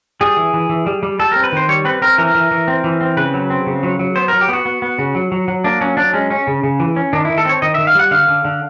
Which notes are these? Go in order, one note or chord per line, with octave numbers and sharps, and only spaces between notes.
G3 G#4
E3
E3
E3
G3
G3
G3 A4
C4 A#4
B4
D#3 C5
G3 C#5
C4 B4
C4 A#4
E3 A#4
E3
E3
C4
E3
C4
C#3 B4
F#3
C4
C#3
F#3
F#3
B3 C5
F#3 A#4
G4
B3 F#4
B3
B3
C#3
F#3
F#3
F#3
A#3 D4
F#3 C#4
F#3 D4
G#3 C#4
C#4
C#3
C#3
E3
C#4
D#3 D4
D#3 E4
A4
C4 C#5
D#3 D#5
D#3 E5
F5
G3 F#5
D3 F5
D3
D3